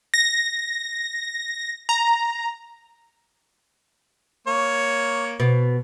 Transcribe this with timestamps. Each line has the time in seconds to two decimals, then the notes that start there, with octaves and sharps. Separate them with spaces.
0.14 A#6
1.89 A#5
4.47 A#3 C#5
5.40 B2